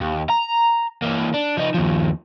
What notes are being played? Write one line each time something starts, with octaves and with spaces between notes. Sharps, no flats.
D#2
A#5
E3 A#3
D4
F3 D#4
D#2 F3